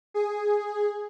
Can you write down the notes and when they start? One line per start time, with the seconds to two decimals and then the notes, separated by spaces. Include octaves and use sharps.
0.14 G#4